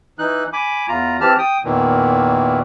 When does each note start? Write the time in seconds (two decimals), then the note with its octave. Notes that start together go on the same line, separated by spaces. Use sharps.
0.19 E3 D#4 F#6
0.53 G#5 B5 D6
0.88 E2 F4 A#5
1.21 E3 C4 G4 A5 F6
1.38 G5 D#6
1.64 E2 A#2 D#3 E3